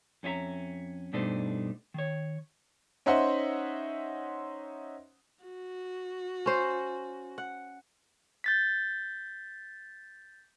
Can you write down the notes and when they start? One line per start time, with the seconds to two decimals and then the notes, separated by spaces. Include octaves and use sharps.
0.23 F2 C#4 F4 E5 A#5
1.13 G2 B2 A3 D4 D#4 C5
1.94 D#3 C#5
3.06 C#4 D#4 C5 E5 F#5 C6
5.44 F#4
6.46 C#4 C5
7.38 F#5
8.44 G6 A6 B6